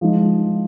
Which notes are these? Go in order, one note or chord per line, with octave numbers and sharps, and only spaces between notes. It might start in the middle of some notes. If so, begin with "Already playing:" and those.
F3 G#3 D#4